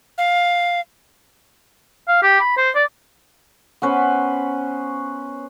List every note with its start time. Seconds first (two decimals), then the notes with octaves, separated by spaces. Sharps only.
0.18 F5
2.08 F5
2.23 G4
2.40 B5
2.57 C5
2.75 D5
3.82 B3 C#4 B4 C5